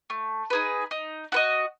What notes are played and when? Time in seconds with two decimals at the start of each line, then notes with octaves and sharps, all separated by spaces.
0.10 A3
0.50 D#4 G#4 B4
0.91 D#4
1.32 F#4 B4 D#5